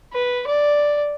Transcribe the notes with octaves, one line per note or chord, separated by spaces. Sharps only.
B4
D5